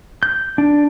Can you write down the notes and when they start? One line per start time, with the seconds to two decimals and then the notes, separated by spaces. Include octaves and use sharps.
0.23 G6
0.58 D4